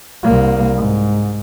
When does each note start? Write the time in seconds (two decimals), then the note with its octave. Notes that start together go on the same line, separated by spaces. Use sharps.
0.23 C2 A#3
0.75 G#2